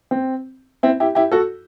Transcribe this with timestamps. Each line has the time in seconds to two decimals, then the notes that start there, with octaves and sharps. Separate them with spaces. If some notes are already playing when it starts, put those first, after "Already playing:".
0.11 C4
0.83 C4 E4
1.00 E4 G4
1.15 E4 G4
1.32 F#4 A4